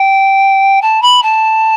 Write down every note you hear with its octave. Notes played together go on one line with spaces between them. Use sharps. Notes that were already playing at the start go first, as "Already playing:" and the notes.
Already playing: G5
A5
B5
A5